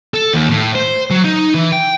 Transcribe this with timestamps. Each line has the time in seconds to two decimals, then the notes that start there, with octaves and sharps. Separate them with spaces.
0.14 A4
0.33 D#2
0.49 A2
0.75 C5
1.11 F#3
1.24 D#4
1.54 E3
1.72 G5